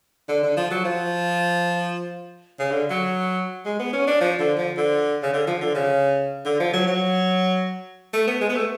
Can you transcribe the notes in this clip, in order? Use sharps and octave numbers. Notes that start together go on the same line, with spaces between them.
D3
D3
F3
F#3
F3
C#3
D3
F#3
G#3
B3
C#4
D4
F3
D3
F3
D3
C#3
D3
F3
D3
C#3
D3
F3
F#3
F#3
A3
B3
G#3
B3
A3